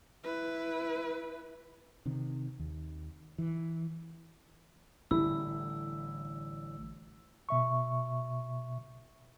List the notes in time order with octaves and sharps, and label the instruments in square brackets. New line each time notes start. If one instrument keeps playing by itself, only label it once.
[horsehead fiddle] E4 B4
[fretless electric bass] C3 D#3
D#2
E3
[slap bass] A1 D3 G3 [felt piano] E4 [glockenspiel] E6
[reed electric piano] B2 E5 C#6